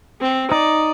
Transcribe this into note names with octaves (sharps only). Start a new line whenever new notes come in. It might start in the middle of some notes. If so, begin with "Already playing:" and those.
C4
D#4 D5